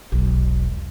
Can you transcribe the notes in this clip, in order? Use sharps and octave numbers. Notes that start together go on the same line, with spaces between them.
E1 B1